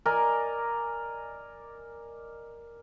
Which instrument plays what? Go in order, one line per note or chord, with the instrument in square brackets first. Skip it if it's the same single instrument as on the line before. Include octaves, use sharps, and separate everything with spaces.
[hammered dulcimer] A#4 D5 D#5 G#5